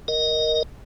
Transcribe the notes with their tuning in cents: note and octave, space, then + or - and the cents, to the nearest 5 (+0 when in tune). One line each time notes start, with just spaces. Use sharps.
A#4 +0 D#5 +0